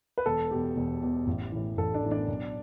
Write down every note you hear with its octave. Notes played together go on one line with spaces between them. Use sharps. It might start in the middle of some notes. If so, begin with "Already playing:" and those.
B4
E1 A4
E2 B2 G4
E1
E2 B2
A1
A2 E3
A1 A4
D4 D5
A2 E3
D4 D5
B1